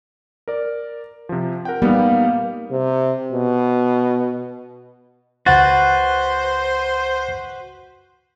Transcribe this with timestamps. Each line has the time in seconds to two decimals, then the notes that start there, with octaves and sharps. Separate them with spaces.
0.48 A#4 D5
1.29 C3 F3
1.65 A#4 F#5 G5
1.82 G3 A#3 B3 D#4
2.71 C3
3.32 B2
5.46 C#2 F#4 B4 C5 F#5 A6